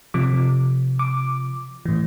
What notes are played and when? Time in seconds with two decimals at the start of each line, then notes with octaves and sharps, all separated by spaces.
0.14 C3 F3 D6
0.99 D6
1.86 A2 E3